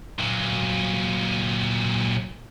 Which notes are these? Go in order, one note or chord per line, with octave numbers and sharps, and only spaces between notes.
A#2 F#3